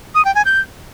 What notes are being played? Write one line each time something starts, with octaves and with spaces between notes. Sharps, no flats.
D#6
G5
G#5
G6